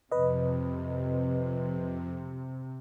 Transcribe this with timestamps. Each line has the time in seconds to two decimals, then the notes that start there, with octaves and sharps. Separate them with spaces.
0.11 F2 C3 B4 D#5